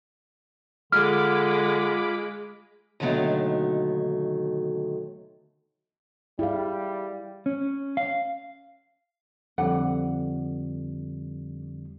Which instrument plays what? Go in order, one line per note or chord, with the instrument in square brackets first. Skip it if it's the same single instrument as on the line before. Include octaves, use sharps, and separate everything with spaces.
[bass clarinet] D3 [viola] G#3 [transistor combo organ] F4 B5 D6 [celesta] F6
[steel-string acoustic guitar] D#2 B2 D3 D#3 F#3 A3
[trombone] G3 [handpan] E4 G#4 F5
[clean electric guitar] C#4
F5
[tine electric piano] F2 D3 G3 [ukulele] D4 F#5